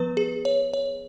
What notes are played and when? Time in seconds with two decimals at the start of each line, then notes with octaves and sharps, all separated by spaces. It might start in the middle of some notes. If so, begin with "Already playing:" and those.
Already playing: F3 B3 B4
0.17 G#4
0.45 C#5
0.74 C#5